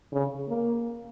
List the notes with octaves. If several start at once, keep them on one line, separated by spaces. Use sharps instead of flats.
C#3
A#3